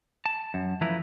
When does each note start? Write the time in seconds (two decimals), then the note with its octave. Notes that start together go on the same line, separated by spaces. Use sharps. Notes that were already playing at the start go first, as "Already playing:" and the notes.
0.26 A5
0.54 F#2
0.81 E3 F3 A3 E4 B4 A#5